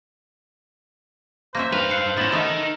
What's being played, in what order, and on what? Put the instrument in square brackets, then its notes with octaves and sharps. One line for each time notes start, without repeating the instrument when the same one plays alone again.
[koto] A#3 C#4 E5 [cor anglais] C5 [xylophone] A#6
[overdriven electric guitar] G2 F5 [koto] B4
[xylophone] F#6 C7 C#7
[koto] B3 C#4 [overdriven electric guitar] E4 C#5 [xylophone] A6 A#6
[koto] A3 B3 A4 [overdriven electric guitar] D#4 A#4 [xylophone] E6